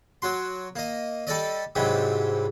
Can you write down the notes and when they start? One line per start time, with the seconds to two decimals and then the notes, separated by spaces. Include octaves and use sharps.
0.22 F#3 F#4 C6
0.76 A#3 D#5
1.27 G3 A4 D5 D#5
1.75 G#2 C3 E3 F#3 G3